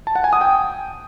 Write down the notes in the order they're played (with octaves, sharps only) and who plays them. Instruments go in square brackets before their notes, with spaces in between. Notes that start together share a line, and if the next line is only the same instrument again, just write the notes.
[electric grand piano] A5
F#5
G#5
D#6
G5